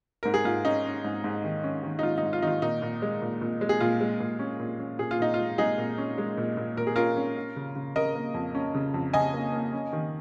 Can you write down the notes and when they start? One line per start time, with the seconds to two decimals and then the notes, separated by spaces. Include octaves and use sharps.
0.23 G#2 A#4
0.34 G#4
0.45 G#2 F4
0.65 C#4 D#4
0.85 C#4
1.04 G#2
1.24 G#2
1.44 D#3
1.64 C#4
1.83 D#3
1.99 D#4
2.03 G#2 F4
2.18 G#2 D#4
2.33 F4
2.42 D#3 D#4
2.47 F4
2.62 A#2 D#4
2.82 A#2
3.02 G#3
3.22 A#2
3.41 A#2
3.61 G#3
3.69 G#4
3.80 A#2 F4
4.01 G#3
4.20 A#2
4.39 C#4
4.59 A#2
4.79 C#4
4.99 A#2 G#4
5.11 F4
5.19 A#2 D#4
5.34 G#3 F4
5.58 G#3 D#4 G#4
5.78 A#2
5.98 C#4
6.18 G#3
6.37 A#2
6.57 A#2
6.77 A#2 A#4
6.87 G#4
6.96 C#4 F4 A#4
7.17 C#4
7.37 C#4
7.56 C#3
7.76 C#3
7.96 C#3 A#4 D#5
8.16 A#3
8.34 F2
8.55 C#4
8.75 C#3
8.94 F2
9.13 C#3 D#5 G#5
9.33 A#3
9.53 A#3
9.73 C#4
9.93 D#3